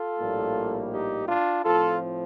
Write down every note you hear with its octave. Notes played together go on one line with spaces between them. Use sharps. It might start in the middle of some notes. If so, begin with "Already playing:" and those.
Already playing: F4 A4
A#1 A2 G3 A#3
D#4 G4
D4 F4
A2 F3 C4 F4 A4